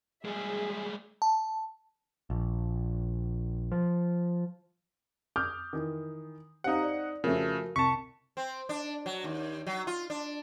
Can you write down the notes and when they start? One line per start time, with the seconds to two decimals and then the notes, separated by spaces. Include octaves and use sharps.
0.25 G3 G#3 G#4 E5
1.22 A5
2.30 A#1
3.72 F3
5.36 D6 D#6 F6 G6
5.73 D#3 E3
6.64 C4 D#4 G4 F5 F#5 A#5
6.83 D5
7.24 C#3 F3 A3 F#4 A#4
7.76 C2 A5 C#6 B6 C#7
8.37 C4
8.69 D4
9.06 F#3
9.24 D#2
9.67 F#3
9.87 F4
10.10 D4